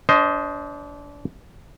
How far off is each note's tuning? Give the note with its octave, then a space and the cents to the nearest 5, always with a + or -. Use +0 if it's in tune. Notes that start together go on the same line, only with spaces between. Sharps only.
D4 -30 C5 +0 D#5 +15